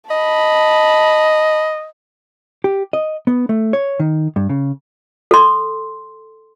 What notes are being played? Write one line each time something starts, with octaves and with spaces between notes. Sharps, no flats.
D#5 A5 B5
G4
D#5
B3
A3
C#5
D#3
G2
C#3
A4 C6